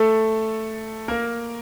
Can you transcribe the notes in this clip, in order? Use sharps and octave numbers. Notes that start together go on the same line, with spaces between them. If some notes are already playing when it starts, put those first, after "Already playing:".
Already playing: A3 A4
A#3 A#4